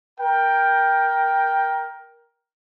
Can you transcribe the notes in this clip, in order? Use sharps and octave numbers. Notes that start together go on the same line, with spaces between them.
A#4 G5